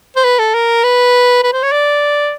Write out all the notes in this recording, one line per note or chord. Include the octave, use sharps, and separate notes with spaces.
C5
B4
A4
A#4
B4
B4
C5
C#5
D5